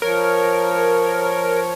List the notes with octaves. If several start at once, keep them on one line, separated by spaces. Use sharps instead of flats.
F3 A#4 C#5